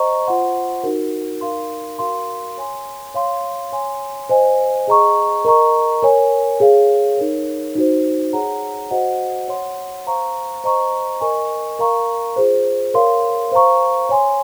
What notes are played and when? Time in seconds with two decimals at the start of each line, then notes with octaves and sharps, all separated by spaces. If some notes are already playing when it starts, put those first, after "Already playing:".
Already playing: C5 D#5 A#5 C#6
0.27 F4 C5 F#5 C6
0.84 D#4 F#4 A#4
1.41 D#4 A#4 F5 C6
1.99 F#4 A#4 F5 C6
2.58 C#5 G#5 C6
3.14 C#5 F5 C6
3.73 C#5 G#5 C6
4.29 C5 D#5 G#5
4.88 G#4 D#5 A#5 C#6
5.45 A#4 D#5 A#5 C#6
6.02 A#4 C#5 G#5
6.60 G#4 C#5 F5
7.17 D#4 A#4 C#5
7.75 D#4 F#4 C5
8.33 G#4 C#5 F#5 A#5
8.91 F#4 C5 D#5 F#5
9.48 C#5 F#5 C6
10.07 C5 F5 A#5 C#6
10.64 C5 D#5 A#5 C#6
11.21 A#4 D#5 G#5 C#6
11.79 A#4 F5 A#5 C#6
12.36 F4 G#4 C5
12.94 A#4 C#5 F5 C6
13.52 C5 F5 A#5 C#6
14.09 C#5 G#5 C6